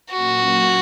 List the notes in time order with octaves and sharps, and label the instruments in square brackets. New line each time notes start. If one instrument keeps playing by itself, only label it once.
[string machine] A#2 F#3 A#3 C#4 [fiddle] F#4